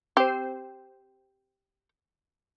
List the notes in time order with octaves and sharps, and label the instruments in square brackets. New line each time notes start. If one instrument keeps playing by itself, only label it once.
[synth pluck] C4 C5 [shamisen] G4